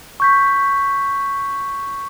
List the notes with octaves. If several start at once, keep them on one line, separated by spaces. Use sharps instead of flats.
C#6 G6 B6